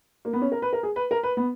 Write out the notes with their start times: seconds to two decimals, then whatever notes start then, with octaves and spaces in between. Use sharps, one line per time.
0.25 A#3
0.33 B3
0.42 C#4
0.52 A#4
0.62 B4
0.73 A#4
0.83 G#4
0.96 B4
1.11 A#4
1.23 B4
1.37 B3